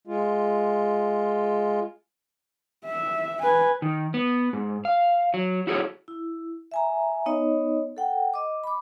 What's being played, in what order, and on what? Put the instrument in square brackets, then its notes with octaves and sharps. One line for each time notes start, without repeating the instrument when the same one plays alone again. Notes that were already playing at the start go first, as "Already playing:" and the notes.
[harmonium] G#3 F4
[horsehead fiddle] E5
B4 G#5
[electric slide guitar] D#3
B3
G#2
F5
F#3
E4 F#4 G#4 A4 C#5
[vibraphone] E4
E5 G#5 A#5
B3 D#4 C#5 D#5
A4 F#5 G5
D#5 D6
B5 D6